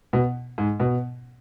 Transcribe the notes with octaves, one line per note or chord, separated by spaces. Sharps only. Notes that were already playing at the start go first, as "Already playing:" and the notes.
B2
G#2
B2